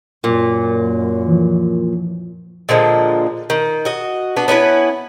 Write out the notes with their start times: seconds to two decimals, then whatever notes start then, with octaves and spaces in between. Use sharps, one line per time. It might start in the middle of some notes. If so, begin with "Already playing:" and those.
0.24 F#2 A#2
1.27 E3 F3
2.69 A#2 D3 F3 G#3
3.50 D#3
3.85 F#4 D#5
4.36 B3 D4 F#4
4.48 B3 C#4 E4 B4